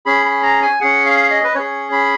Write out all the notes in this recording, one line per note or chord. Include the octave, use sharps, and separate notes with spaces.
C#4 G#4 B5
B5
A#5
G#5
C#4 G#4 F#5
F5
D#5
B4
C#4 G#4 C#5
B5